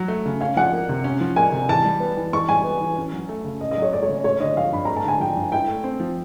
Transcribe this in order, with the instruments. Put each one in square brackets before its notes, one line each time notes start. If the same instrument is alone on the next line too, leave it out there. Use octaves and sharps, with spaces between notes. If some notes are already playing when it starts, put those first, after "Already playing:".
Already playing: [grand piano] F#3
A3
C#3
[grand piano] C#4 [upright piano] F5
[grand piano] F3 [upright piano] F#5
[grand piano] A#3
C3
C#4
F3
[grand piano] A#3 [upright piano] G#5
[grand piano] C3
[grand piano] E3 [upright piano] A5
[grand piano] G3
B3
E3
[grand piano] E3 [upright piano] C#6
[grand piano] G3 [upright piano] G#5
[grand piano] B3
E3
C#4
F#3
A3
C#3
[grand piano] C#4 [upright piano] D#5
[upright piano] D#5
[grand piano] F#3 [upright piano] C#5
[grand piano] A3 [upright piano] D5
[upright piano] C#5
[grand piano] C#3
[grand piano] A3 [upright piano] C#5
[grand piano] D3 [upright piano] D#5
[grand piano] F3 [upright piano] F5
[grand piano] G2 [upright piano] B5
[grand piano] A3 [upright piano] A#5
[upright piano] A5
[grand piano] D3 [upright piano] G#5
[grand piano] F3 [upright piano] G5
[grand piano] G2
[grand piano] E4 [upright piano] G5
[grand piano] A3
C4
F3